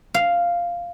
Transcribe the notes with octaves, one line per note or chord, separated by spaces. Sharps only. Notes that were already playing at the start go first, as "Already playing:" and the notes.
F5